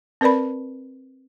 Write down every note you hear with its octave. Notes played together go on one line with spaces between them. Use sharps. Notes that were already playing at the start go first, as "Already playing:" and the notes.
C4 A#4 B4 D5 B5